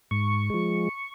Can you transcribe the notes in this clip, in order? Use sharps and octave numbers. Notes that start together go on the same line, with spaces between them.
G#2 C#6
F3 G#3